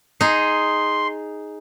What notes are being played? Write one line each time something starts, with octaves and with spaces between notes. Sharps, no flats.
D#4 G#4 C6